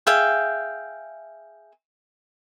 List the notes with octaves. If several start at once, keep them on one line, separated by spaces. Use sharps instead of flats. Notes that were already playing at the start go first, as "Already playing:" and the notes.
G#4 E5 F5 G5